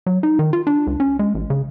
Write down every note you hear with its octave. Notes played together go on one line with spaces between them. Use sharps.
F#3
D#4
D#3
F4
D4
C#2
C#4
G#3
A1
C#3